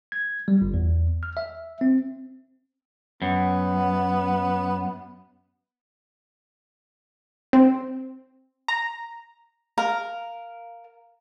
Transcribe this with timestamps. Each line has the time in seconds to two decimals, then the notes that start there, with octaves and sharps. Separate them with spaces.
0.12 G#6
0.48 G3
0.61 G1
0.74 E2
1.23 F6
1.37 E5
1.81 C4
3.22 F#2 B3
7.53 C4
8.68 A#5
9.78 A#4 F5 A#5